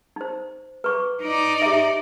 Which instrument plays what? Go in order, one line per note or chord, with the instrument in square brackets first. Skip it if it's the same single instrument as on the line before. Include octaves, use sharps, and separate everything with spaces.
[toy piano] D#4 C5
B4 C#6 D6
[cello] D#4 D5
[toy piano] G4 E5